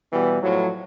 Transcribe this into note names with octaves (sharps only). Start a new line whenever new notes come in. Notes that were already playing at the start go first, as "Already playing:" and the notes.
B2 E3 G3 B3
A2 F3 F#3